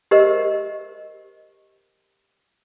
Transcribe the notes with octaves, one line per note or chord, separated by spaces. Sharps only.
G4 A#4 C5 D#5 E5 E6